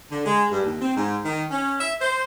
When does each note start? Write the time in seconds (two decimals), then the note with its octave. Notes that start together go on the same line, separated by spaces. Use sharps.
0.10 D3
0.26 G#3
0.51 G2
0.64 D#2
0.81 C4
0.96 G#2
1.24 D#3
1.51 C#4
1.80 E5
2.00 C5